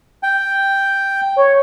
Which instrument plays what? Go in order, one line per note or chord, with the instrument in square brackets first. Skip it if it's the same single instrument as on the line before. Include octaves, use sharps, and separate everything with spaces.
[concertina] G5
[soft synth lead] C#5